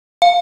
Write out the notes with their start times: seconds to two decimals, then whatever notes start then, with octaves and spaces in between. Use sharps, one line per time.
0.22 F5